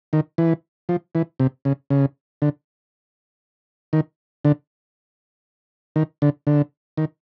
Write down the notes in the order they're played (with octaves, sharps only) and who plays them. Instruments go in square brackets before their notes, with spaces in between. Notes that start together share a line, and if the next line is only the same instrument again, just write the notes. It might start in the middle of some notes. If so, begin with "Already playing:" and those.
[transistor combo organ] D#3
E3
F3
E3
C3
C#3
C#3
D3
D#3
D3
D#3
D3
D3
D#3